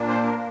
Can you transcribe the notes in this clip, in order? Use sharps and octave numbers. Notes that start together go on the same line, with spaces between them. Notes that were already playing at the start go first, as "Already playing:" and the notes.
Already playing: A#2 A#3 D4
C5
A#4